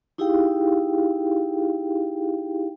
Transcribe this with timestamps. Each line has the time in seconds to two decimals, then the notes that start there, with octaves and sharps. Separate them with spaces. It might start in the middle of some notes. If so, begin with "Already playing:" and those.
0.18 D#4 E4 G4 G#4 F5 G5